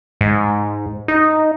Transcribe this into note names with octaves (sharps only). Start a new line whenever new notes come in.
G#2
D#4